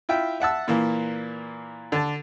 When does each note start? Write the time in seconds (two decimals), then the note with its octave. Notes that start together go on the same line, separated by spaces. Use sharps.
0.09 E4 F4 E5 G5
0.40 E5 F#5 A5 E6
0.68 A#2 E3 A#3
1.92 D3 A5